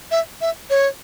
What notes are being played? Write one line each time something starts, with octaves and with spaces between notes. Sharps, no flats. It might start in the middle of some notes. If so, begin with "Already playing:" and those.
E5
E5
C#5